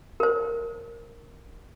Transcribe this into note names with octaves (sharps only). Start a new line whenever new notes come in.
A#4 C5